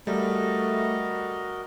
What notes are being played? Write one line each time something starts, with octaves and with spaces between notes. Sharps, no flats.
G3 A3 F#4 A#4 D#5